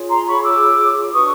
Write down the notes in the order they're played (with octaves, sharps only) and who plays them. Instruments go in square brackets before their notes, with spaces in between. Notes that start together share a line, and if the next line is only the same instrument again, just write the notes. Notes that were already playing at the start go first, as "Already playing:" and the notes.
Already playing: [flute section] F4 G#4 C#5
A#5 C6
B5 C#6
D6 E6
D4 F#4 B4 C#6 D#6